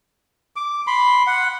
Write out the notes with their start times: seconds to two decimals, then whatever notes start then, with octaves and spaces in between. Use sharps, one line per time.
0.56 D6
0.87 B5 C6
1.27 F#5